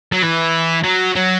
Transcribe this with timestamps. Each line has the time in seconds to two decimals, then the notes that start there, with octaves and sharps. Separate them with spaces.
0.13 F#3
0.23 E3
0.84 F#3
1.15 F#3